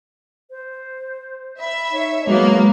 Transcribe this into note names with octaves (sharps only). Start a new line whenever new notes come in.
C5
E5 B5
D#4 C#5
F#3 G#3 A#3 B3